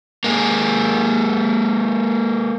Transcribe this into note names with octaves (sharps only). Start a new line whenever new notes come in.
G#3 A#3